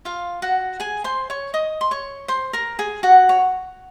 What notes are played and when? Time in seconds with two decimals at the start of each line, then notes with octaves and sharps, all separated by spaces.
0.05 F4 F5
0.42 F#4 F#5
0.80 G#4 G#5
1.04 C5 C6
1.30 C#5 C#6
1.54 D#5 D#6
1.81 C6
1.91 C#5 C#6
2.28 C5 C6
2.53 A#4 A#5
2.79 G#4 G#5
3.03 F#4 F#5
3.29 C#5